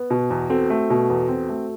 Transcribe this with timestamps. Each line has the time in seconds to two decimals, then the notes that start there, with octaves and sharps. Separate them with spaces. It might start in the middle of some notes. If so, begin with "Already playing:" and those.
Already playing: B3
0.10 B2
0.30 E2
0.50 C4 F#4 A4
0.70 A3
0.90 B2
1.10 E2
1.29 C4
1.49 A3